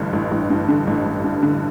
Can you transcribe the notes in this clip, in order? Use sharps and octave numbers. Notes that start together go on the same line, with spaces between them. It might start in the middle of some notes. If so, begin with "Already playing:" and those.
Already playing: A1 G2 D3
A1
A1
G2
D3
A1
A1
G2
D3